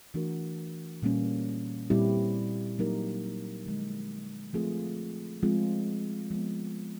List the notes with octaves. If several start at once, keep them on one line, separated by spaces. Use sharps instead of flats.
E3 A3 D4 F#4 A#4
A#2 G3 A#3 C#4
A#2 G3 C4 E4 G4
F#3 A#3 D#4 G4 A#4
D3 F3 G#3
F3 A3 C4 F4 G#4
F3 G#3 C4 F4 G#4
F3 G#3 B3